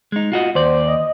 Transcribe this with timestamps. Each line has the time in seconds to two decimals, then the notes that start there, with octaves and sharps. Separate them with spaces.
0.12 G#3 D#4
0.32 F4 F#4 D#5
0.55 D#2 C5 D5
0.88 D#5